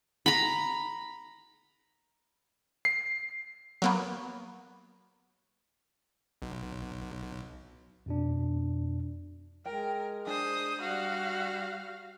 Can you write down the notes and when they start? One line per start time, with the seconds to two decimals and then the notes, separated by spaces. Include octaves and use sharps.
0.26 A#5 B5
2.85 C7
3.82 F#3 A#3 B3
6.42 B1
8.06 F2 B2 D4
9.66 G#3 A#4 G5
10.27 D4 C5 G#5 D#6
10.81 G3 F#4 F5